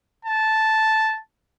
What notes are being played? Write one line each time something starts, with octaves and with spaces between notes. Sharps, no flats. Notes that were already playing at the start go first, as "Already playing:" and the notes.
A5